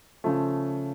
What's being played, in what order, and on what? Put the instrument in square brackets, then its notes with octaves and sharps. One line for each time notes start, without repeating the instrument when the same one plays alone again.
[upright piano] C#3 F3 A3